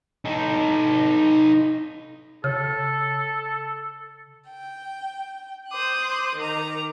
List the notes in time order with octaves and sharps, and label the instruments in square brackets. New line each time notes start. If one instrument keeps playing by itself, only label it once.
[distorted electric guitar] D#4 A4
[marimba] C#3 [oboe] A4
[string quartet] G5
[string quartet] C5 D#6 F#6 [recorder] D6
[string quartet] D#3 A#5